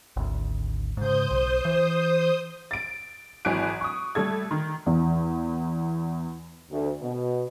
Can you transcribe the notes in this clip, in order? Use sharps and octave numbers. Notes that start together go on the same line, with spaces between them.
G#1 D2
G#2 C#3 C5 D#6 G6
B1
E3
A6 D7
G#1 E3 F#3 G#5 F#6 D7
C#6 D#6
G3 A3 A4 G#6
D#3
E2
D2
B2